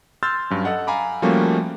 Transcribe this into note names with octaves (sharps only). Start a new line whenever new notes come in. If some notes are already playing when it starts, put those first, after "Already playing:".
C6 E6 F6 G6 A6
G2 F#3 C#4
A4 D#5 F#5
F5 G#5 A#5 B5 D6
F3 G3 A3 A#3 C#4 F#4